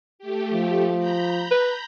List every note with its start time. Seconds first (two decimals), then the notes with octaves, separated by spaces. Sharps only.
0.19 A3 G4
0.53 F3
0.97 A#5 B5 G6
1.51 B4